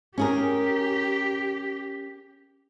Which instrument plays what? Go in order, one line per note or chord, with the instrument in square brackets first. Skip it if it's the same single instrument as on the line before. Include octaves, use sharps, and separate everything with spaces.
[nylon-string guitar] C#4 G#4 A#4 [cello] G4